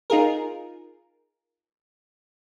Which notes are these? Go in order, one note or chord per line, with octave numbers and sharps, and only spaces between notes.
D#4 F4 G#4 A#4